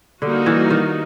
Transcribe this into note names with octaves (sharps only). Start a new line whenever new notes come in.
D3 G3 A#3 D#4 F#4
E3
D#3